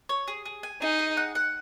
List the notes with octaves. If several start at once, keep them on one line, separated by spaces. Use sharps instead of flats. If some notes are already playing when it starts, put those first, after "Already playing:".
C#5
G#4
G#4
G#5
D#4 G#4
G#4
F#5
F#5